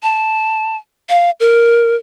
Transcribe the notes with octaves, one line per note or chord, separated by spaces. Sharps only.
A5
F5
A#4